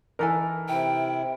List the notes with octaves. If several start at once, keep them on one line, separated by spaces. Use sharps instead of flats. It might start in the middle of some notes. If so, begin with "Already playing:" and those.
E3 D#4 A4 A#4 G#5
C3 E4 G5